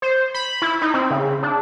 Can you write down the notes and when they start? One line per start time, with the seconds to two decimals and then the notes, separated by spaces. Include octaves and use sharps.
0.02 C5
0.34 B5
0.62 E4
0.82 D#4
0.94 C4
1.11 C#3
1.43 D4